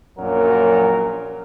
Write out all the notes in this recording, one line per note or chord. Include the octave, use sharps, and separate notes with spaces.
A#1 F#2 A#2 F#3 A#4